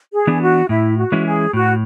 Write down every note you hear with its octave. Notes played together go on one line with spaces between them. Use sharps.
G#4
E3 B3 D4
F#4
A2 E4
F#4
E3 G#3 C#4 E4
G#4
A2 F#4